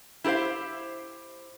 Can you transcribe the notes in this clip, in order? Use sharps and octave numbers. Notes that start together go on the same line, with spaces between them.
E4 G4 A4 C5 F5